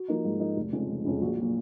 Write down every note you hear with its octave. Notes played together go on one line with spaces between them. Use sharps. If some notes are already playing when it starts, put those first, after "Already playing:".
Already playing: F#4
F3 A#3 D#4
G#2
F3 A#3 D#4
F1
F2 C#3 G#3
F1
F2 C#3 G#3
A#1 F#4
A#2 F#3